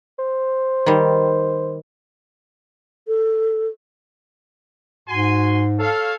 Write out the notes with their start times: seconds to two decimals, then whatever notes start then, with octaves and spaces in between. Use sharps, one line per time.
0.19 C5
0.86 D#3 G3
3.07 A4
5.09 G#2 F#4 G#5 C6
5.79 A4 C#5 F5